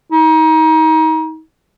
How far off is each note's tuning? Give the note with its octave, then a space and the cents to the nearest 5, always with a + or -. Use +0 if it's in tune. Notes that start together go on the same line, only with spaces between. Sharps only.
D#4 +30